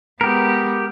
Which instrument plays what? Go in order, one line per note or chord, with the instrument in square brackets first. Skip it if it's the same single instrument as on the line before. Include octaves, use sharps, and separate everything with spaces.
[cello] G#3 B3 [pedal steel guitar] G4 A#4